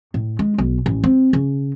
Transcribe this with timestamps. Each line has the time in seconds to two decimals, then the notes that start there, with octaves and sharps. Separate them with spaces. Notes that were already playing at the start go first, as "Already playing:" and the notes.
0.14 A2
0.39 G#3
0.58 B1
0.86 A1
1.04 C4
1.33 C#3